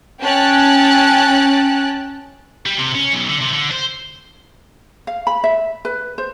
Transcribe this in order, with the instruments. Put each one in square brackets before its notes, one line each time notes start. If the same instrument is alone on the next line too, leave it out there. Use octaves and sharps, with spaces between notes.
[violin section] C#4 G5 A5 F#6
[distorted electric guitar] G3
C3
C#4
B1
D3
C3
D3
C5
[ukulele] F5
B5
E5
B4
C5